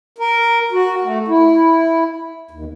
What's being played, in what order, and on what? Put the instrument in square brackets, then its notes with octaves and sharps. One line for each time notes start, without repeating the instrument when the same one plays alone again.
[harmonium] A#4
F#4
A3
E4
D#2